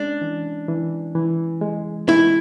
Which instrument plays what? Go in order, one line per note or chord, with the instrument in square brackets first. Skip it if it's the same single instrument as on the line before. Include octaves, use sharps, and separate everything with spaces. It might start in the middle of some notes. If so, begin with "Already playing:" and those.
Already playing: [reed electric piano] G#3 C#4 [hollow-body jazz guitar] D4
[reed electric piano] E3
E3
E3
G#3
[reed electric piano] G#3 [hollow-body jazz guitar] E4